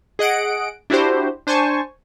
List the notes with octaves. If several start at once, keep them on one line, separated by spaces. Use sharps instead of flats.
G#4 D#5 F#5 D7
D4 E4 F#4 G4 C5
D4 C5 G#5 A5 C#6